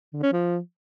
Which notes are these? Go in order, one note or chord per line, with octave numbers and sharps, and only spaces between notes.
D3
C#4
F3